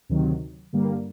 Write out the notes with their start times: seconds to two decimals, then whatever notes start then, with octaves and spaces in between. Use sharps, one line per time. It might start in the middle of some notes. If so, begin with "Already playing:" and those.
0.09 D2 C3 D#3 F#3
0.73 G2 D3 G3 A#3